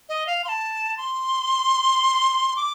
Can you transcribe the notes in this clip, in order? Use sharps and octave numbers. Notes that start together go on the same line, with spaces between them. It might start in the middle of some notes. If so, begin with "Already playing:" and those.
D#5
F5
C6
A5
C6
D6